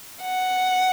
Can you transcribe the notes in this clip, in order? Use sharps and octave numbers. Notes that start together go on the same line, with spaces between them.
F#5